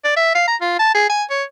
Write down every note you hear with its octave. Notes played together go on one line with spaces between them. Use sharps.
D5
E5
F5
A#5
F4
A5
G#4
G#5
C#5